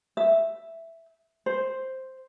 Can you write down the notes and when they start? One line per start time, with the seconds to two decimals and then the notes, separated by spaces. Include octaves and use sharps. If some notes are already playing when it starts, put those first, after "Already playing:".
0.17 E5
1.46 C5